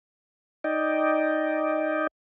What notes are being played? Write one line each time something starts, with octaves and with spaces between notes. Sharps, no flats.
D#4 D5 D#5 G5